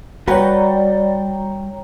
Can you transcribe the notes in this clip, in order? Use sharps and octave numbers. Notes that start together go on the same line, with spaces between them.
G3 F#4 B4 C#5 D5 G5 A#5